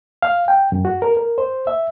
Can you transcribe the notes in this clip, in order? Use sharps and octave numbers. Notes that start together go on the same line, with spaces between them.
F5
G5
F#2
F#4
A#4
A#4
C5
E5